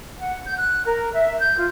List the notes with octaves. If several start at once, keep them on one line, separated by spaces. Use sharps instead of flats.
F#5
G6
F#6
A#4
E5
G6
F4